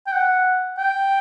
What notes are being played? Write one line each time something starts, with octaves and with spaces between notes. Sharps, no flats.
G5
F#5
G5